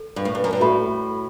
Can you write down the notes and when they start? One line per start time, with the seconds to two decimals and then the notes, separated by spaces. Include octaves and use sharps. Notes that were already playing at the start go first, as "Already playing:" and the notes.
Already playing: A4
0.16 G2
0.25 A2
0.35 G2
0.44 F#2
0.53 G2
0.60 A2 F#4 A4 E5 B5